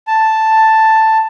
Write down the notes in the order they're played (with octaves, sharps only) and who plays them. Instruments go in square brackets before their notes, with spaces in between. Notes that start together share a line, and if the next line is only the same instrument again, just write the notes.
[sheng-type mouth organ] A5